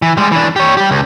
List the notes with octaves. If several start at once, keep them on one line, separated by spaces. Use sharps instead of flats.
E3
G3 G#3
E3 D4
G4 C#5
G3 G4
C#2